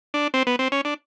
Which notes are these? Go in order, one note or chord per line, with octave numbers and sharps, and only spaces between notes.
D4
C4
B3
C4
C#4
D4